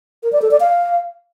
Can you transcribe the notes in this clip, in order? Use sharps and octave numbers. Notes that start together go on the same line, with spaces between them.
A#4
D5
A4
D5
F5